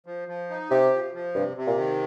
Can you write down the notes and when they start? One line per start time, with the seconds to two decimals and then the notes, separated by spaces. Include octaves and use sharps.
0.06 F3
0.28 F3
0.50 D#4
0.70 C3 G4
0.93 F3
1.14 F3
1.35 G2 C3
1.57 C3
1.67 A#2
1.77 D#3